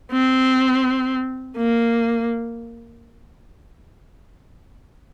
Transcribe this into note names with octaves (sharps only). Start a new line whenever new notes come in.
C4
A#3